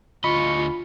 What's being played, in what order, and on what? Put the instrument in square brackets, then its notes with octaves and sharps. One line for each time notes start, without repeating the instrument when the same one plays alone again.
[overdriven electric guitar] D2 D#5 [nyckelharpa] F4 [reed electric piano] B5 [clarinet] C#6